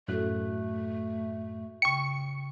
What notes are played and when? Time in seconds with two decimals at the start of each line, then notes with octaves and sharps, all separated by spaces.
0.08 F#2 A2 A3 F#4 A4 F#6
1.82 C#3 G5 C#6 C#7